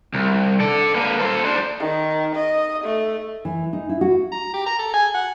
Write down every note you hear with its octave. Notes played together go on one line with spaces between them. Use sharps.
C2
A4 D5
A#3 B4
A4 C5
D4 C5
D#3
D#5
A3
E3
D#4
E4
F#4
A#5
G4
A#5
A4
G#5
F#5